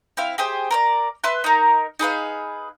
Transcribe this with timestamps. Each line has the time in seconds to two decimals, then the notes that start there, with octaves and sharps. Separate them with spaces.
0.17 C4 E4 F5
0.38 G4 G#4 C5
0.71 A#4 C5 D5
1.24 B4 E5 C6 F#6
1.44 D#4 A#4
1.99 D#4 G#4 B4 F5